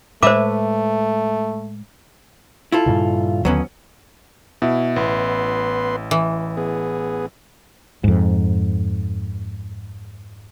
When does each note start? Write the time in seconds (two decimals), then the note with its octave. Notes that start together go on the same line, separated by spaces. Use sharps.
0.23 A2 G#3 A3 B4 C5 E5 D6
2.72 E4 F4 A4
2.86 G2 A#2 C#3
3.45 D#2 D3 F#3 B3 C#4
4.62 B2 E4
4.96 A1 B3 B4 C6
6.11 E3
6.57 B3 G#4
8.04 F2 G#2